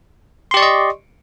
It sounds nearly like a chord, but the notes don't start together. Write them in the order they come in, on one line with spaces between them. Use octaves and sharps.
C6 G4 D5 C#6 D#5